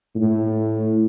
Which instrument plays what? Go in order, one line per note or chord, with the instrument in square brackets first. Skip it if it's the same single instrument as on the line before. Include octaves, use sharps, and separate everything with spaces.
[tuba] A2